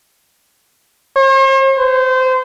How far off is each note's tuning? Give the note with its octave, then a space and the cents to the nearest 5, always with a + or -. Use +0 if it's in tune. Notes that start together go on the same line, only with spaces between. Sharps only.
C5 +45
C5 -25